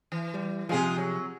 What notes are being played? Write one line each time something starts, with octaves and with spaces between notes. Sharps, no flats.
E3
G3
C3 F3 G#3 F4 G#4
F#3